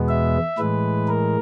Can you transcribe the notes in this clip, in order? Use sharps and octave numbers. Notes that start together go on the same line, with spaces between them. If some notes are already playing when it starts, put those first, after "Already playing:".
Already playing: E2 B2 G#3 B3
E5
A2 E3 G#3 B4
A#4